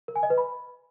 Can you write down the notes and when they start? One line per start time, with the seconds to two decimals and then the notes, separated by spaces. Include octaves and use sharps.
0.08 A#4
0.16 G#5
0.23 D#5
0.30 B4
0.38 B5